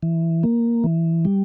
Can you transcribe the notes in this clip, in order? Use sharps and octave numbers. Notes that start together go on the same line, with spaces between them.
E3
A#3
E3
G3